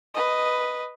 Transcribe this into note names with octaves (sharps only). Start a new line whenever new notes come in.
B4 D#5